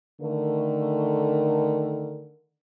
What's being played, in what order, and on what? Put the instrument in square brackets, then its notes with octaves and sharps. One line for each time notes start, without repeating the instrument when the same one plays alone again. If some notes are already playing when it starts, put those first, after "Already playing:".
[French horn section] D3 D#3 A3 A#4